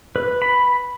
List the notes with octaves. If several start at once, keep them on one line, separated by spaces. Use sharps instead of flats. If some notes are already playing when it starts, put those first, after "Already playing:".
B4
B5